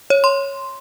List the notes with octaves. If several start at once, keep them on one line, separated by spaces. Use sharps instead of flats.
C#5
C6